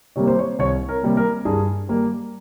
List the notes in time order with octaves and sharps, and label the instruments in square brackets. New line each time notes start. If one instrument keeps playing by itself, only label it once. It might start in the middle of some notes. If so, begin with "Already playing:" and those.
[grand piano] C3 G3 A#3 C#5
C5
C#5
C2 C#5
A#4
C3 G3 A#3
A#4
G2 G#4
G3 A#3 G4